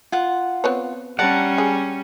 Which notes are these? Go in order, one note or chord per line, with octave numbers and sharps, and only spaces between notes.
F4 F#5
B3 C4 C#5
G3 C#4 D5 F#5 A5 A#5
G#3 G#4